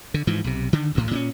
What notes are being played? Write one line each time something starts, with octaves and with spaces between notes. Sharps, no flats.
D3
G#2 E3 F3
B1 C3
D3 D#3
A1 D2 A2
A#2 C4 C#4